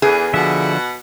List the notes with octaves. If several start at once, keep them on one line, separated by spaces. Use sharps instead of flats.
E2 G#4
B2 D3 F3 E5 F#5